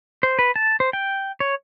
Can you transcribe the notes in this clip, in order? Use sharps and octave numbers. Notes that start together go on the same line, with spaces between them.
C5
B4
A5
C5
G5
C#5